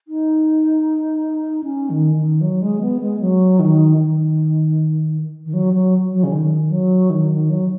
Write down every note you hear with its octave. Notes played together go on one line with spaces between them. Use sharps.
D#4
C#4
D#3
D#3
F#3
G#3
B3
G#3
F#3
D#3
D#3
D#3
F#3
F#3
F#3
C#3
D#3
F#3
D#3
D#3
F#3